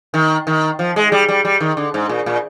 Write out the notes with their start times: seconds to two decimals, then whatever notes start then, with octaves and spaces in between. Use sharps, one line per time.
0.14 D#3
0.47 D#3
0.79 F3
0.96 G#3
1.12 G3
1.29 G3
1.45 G3
1.60 D#3
1.77 D3
1.94 G#2
2.09 A#2
2.26 A#2